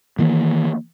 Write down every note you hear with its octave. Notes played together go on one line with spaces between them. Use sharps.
D#3 E3 A#3